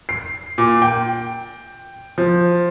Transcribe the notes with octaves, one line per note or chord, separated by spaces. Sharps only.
C7
A#2
G5
F3